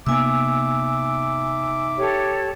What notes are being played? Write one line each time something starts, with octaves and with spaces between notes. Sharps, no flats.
C3 A#3 B3 D#4 E5 G#5 D6 E6
G4 A4 C#5